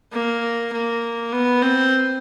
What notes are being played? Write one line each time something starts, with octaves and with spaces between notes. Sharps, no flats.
A#3
A#3
B3
C4